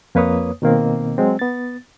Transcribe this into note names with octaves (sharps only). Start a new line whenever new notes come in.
F2 A#3 B4 C#5 D#6
B2 D#3 A#3 C4
F#3 G#3 C4
B3 A6